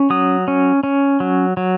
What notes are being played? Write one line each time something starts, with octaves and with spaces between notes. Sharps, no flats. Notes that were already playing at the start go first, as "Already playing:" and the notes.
Already playing: C#4
F#3 D#6
C#4
C#4
F#3
F#3